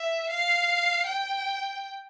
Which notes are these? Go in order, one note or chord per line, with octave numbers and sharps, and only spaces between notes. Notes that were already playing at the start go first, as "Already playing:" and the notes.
Already playing: E5
F5
G5